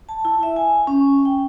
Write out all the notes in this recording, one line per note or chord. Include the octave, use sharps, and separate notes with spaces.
A5
E4
E5
G#5
C#4
G5